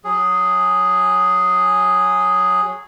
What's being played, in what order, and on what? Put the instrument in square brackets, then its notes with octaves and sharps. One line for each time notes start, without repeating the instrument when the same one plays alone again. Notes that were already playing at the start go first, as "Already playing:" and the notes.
[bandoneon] F#3 G#4